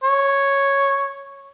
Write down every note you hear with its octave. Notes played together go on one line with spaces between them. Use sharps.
C#5